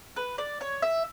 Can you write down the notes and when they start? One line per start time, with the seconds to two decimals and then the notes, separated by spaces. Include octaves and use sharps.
0.16 B4
0.38 D5
0.61 C#5
0.82 E5